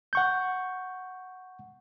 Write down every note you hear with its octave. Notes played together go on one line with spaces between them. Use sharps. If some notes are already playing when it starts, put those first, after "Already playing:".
F#5 C#6 G6